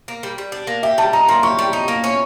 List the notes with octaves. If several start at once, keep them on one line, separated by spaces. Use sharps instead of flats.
A#3
G3
G3
D4
A#3
G4 E5
G3 A5
D#4 A#5
A#3 C6
G4 C#6
G3
D#4
A#3
C#4